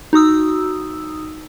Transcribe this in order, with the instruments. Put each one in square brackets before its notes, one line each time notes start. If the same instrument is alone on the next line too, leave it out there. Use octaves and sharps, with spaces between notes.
[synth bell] D#4 F#4 D#6 E6